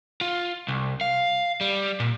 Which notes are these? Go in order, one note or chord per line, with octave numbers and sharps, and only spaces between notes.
F4
C2
F5
G3
A#2